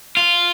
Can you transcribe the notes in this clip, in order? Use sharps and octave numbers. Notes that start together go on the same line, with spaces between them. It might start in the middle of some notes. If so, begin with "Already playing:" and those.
F4